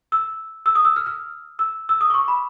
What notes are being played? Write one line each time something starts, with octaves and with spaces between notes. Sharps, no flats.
E6
E6
D#6
E6
F6
F6
E6
E6
D#6
D6
C#6
B5